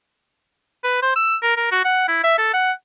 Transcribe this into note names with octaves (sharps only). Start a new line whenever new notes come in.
B4
C5
E6
A#4
A#4
F#4
F#5
E4
E5
A4
F#5